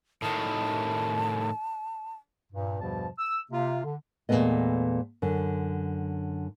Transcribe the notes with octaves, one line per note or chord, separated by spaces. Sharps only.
A2 D#3 A5
G2 A#2
E2 G2 B2 F3 G3 A5
E6
C3 A#3 F4
D3
E2 A#2 F#3 A3 B3 D#5
F#2 D3